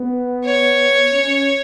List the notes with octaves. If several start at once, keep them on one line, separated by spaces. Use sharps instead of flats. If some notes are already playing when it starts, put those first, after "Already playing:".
Already playing: B3
C#5
C#4